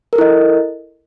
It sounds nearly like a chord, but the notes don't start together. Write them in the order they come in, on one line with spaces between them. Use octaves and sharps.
A#4 A4 E4 D#5